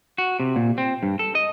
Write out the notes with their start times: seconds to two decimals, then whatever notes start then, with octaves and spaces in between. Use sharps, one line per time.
0.18 F#4
0.40 C3
0.56 A#2
0.78 C4
1.03 G2
1.19 A4
1.35 D#5